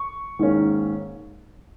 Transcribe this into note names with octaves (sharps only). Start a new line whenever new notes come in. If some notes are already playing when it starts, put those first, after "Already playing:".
Already playing: C#6
G#2 D#3 A#3 C#4